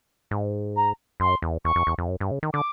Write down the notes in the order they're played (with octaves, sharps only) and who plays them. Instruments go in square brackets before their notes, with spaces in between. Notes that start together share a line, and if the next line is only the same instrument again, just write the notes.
[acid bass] G#2
[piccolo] A#5
[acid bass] F#2 [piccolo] C6
[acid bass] E2
[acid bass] E2 [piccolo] C#6
[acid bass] F2
E2
F2
F#2
G2
C#3
D#3
[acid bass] D3 [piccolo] D6